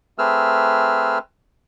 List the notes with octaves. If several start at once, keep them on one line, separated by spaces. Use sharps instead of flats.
A3 C4 G#4 B4 E6 F6